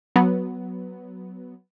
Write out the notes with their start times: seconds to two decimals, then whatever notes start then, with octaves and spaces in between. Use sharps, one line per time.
0.16 F#3 B3